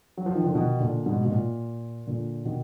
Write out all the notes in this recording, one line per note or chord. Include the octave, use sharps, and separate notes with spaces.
F#3
F3
D#3
D3 F3
B2 D#3
A#2 D3
G#2 B2
B2
A#2
A#2 D3
B2 D#3